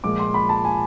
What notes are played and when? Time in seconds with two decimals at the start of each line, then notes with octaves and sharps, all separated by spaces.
0.04 A#2 F3 G#3 D6
0.19 C6
0.34 B5
0.49 A5
0.65 G#5